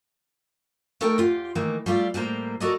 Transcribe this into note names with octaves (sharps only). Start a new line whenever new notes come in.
A3 D#4 A4 A#4 G5
E2 F4 G4
D#3 E3 A3 A#3
G3 A3 F4 D5
A2 G3 A#3 C5 A#5
F#4 A4 A#4 D5 D#5